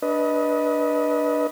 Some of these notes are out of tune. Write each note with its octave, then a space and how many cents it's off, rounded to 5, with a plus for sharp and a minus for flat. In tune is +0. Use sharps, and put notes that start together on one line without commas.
D4 +0 B4 -15 D#5 +20